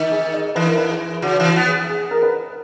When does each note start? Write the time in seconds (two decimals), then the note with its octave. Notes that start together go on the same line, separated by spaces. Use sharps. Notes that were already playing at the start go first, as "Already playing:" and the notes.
Already playing: D#3
0.11 G#4
0.33 D#5
0.55 E3 B4
0.67 A#4
0.78 B4
0.89 G#4
1.22 C#3 F#4
1.40 E3
1.45 F#4
1.56 B3
1.67 G#4
1.89 G#4
2.11 A#4
2.22 B4